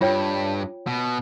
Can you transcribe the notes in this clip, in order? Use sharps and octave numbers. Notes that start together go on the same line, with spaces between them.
G2 F4 C#5 G5
B2